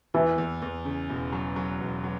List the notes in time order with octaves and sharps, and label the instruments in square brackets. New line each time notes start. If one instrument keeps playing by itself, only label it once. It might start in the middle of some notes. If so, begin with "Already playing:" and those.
[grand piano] E2 [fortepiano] E3
[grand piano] E2
E2
C#3
E1
F#3
F#3
E1
F#3